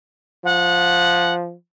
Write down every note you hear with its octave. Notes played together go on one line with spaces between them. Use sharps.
F3 F#5